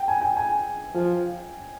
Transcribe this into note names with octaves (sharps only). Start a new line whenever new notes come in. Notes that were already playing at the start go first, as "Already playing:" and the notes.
Already playing: G5
G#5
G5
G#5
F3